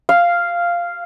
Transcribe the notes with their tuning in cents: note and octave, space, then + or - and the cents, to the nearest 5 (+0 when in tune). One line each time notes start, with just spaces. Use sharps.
F5 -5